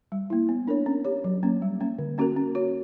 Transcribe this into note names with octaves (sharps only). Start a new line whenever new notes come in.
G3
A#3 E4
B3
D4 A#4 C#5
C#4
G4 C#5
F#3
A#3 C#4
G3
A#3 C#4
D3
A#3 C#4 F#4 A#4
C#4
F#4 C#5